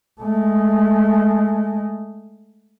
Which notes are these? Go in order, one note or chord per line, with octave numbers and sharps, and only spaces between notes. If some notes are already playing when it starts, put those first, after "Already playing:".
G#3 A3